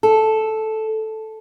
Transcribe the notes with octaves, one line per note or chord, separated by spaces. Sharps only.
A4